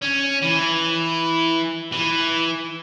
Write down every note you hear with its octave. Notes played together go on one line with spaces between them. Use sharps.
C#4
E3
E3